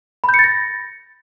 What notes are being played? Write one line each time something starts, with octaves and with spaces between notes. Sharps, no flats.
B5
G6
C#7
A6
A#6